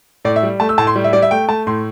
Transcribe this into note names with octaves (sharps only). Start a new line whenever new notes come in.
A2 D5
E5
G3
A3 A5
E6
A2 A5
C6
G3
E5
G3 D5
E5
A3 G5
A3 A5
A2 C6